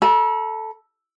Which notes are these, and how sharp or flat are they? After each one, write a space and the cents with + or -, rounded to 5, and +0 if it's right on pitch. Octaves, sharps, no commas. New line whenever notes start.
A4 +0 B5 -45